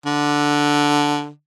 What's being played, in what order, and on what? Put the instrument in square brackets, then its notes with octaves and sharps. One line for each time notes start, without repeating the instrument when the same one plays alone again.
[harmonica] D3